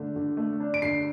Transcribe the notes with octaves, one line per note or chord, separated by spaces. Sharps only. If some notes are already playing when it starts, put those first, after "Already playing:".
Already playing: D3 A3 D4
D3
A3
D4
D7
D3 C7